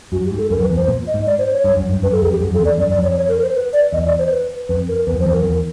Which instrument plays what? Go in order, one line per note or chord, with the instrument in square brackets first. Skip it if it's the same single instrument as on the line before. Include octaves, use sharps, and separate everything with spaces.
[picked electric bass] F#2 [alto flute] F#4
[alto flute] G4
[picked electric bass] G#2
[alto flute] A4
[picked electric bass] F#2 [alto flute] A#4
[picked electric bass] F2
[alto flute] B4
[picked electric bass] E2
[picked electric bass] F2 [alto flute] C5
[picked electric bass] A#2
[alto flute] D#5
[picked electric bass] G#2
[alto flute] D5
C5
C#5
[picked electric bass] G2
F#2
G2
[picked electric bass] F#2 [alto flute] B4
[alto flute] A4
[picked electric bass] F2 [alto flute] G#4
[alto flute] G4
[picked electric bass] F#2 [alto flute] G#4
[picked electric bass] F2
[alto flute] A4
[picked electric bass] E2
[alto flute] D5
[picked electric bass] F#2 [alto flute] D5
[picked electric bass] F#2 [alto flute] D5
[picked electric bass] F2
[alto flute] C#5
C#5
A#4
C5
B4
D5
[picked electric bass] E2 [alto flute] D#5
[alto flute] D5
C5
B4
[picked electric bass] F2 [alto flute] B4
[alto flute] A#4
[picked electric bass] E2 [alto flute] B4
[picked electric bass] F2 [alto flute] C5
[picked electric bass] E2
[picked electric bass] F2 [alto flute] A#4
[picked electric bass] E2 [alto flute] A#4